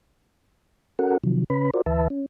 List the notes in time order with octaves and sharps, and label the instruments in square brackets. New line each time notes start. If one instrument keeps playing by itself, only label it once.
[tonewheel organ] C#4 F#4 A4 A#4 F#5
C3 D#3 F3 F#3
C#3 C#4 B4 B5
F4 F#4 A#4 C5 D5
D2 E3 B4 E5 A5
C#4